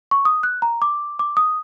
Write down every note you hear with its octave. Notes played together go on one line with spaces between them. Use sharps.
C#6
D#6
F#6
A#5
D6
D6
D#6